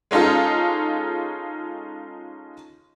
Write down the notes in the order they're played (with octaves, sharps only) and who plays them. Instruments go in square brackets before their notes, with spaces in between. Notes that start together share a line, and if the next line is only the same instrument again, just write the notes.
[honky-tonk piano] G#3 C#4 D#4 F4 A4